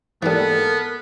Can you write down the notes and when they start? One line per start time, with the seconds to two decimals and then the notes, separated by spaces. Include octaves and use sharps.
0.23 G#2 E3 G3 A#3 B3 A4 A#4